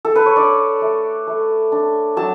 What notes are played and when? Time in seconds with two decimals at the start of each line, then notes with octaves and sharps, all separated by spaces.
0.05 A4
0.16 B4
0.26 C#5
0.36 D4 D5
0.82 A3
1.27 A3
1.72 D4
2.17 F#3 A5